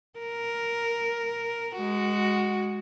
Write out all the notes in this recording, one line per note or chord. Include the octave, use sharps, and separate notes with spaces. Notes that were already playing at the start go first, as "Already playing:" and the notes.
A#4
G#3 F#4